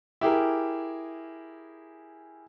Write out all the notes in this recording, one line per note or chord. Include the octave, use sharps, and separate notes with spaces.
E4 G4 G#4 A#4